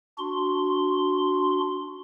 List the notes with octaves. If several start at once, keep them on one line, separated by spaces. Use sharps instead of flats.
D4 F#4 C6